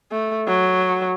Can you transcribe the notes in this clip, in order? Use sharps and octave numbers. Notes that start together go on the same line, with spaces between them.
A3
F#3